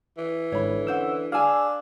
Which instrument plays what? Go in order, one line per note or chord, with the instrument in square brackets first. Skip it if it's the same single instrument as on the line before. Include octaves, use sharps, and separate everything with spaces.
[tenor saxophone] E3
[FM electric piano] G#1 G#2 [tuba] D3 [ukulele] C#5 B5
[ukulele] C#4 C5 F#5 [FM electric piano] E6
[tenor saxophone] D4 [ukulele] G#4 G#5 [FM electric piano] F5 E6 F6